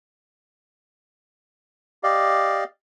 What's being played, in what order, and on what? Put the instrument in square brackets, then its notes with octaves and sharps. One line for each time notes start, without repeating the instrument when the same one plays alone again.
[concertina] G4 D5 D#5 F5